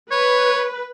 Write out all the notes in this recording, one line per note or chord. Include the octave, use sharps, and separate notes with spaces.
B4 C#5